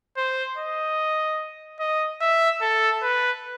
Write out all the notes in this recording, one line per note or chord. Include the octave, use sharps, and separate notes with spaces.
C5
D#5
D#5
E5
A4
B4